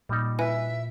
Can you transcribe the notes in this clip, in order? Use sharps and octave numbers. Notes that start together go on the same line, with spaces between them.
A#2 G3 D#4
E4 B4 E5 G#5